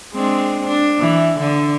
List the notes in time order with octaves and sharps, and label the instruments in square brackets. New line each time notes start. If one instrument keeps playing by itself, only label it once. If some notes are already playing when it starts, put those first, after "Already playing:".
[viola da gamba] G#3 C4 D4
D4
E3
D3